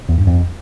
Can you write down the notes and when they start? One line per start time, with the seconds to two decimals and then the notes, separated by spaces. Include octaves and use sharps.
0.09 E2
0.18 G2
0.27 F2